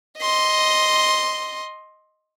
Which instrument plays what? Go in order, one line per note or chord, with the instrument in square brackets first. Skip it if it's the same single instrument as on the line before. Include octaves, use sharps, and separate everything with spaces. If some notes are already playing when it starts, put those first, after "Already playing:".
[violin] D#5 C6